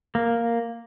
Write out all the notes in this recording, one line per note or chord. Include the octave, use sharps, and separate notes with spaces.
A#3